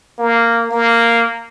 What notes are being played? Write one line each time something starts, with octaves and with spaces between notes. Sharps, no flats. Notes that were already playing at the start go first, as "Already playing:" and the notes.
A#3
A#3